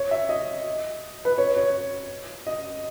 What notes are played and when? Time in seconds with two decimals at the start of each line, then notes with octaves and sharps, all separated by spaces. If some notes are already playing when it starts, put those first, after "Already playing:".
Already playing: C#5
0.11 E5
0.29 D#5
1.25 B4
1.38 C#5
1.57 C#5
2.47 D#5